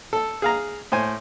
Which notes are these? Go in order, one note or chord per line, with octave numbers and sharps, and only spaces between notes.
A4
G#4 F5 A#5
A2 C5 G#5